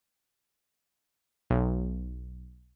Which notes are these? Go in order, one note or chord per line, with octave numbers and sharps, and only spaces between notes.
B1